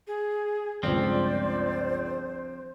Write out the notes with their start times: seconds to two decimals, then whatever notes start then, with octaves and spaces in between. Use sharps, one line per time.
0.07 G#4
0.83 G1 C#2 F3 C4 C5 D5